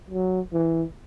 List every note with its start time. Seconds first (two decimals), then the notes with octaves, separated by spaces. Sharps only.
0.11 F#3
0.53 E3